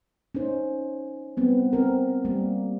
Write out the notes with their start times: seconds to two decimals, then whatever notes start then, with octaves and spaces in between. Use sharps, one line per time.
0.35 C#4 D#4 C5
1.37 G3 B3 C4
1.73 C4 A#4
2.25 G3 A#3